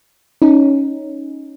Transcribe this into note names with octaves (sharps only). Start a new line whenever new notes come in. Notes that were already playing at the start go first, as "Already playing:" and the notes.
C#4 D#4